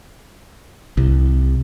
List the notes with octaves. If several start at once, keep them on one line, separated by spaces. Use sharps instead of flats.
C2